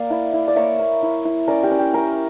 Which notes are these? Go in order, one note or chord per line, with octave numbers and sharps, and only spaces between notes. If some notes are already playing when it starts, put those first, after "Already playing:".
Already playing: A#3 D5 F5
E4
E4
D5
A#3 C#5 E5
A#3
E4
E4
C#4 A#4 D5
G4 A#4
C#4
G4
C#4 G4 A#4